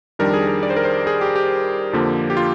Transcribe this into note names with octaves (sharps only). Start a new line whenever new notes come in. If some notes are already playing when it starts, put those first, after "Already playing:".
F2 D#3 G3 D4 A#4
G#4
A#4
D5
C5
A#4
C5
G#4
G4
G4
F2 D3 F3 A#3
G4
F4